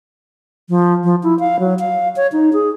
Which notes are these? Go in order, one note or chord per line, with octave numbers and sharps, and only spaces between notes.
F3
F3
E4
F5
F#3
F5
C#5
D#4
G#4